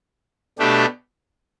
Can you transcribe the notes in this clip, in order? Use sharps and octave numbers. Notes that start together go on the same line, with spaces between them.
B2 A3 D4 G4